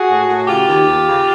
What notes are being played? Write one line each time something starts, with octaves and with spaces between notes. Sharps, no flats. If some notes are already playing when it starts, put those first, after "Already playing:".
Already playing: F#4 G#4
A2
A2
C#3 F4 G4
D#2
D#2
C#3